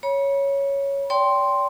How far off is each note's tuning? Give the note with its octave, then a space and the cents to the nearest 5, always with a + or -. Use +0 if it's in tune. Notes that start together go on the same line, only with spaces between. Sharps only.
C#5 +0 B5 -40
D5 -45 G5 +0 C6 +0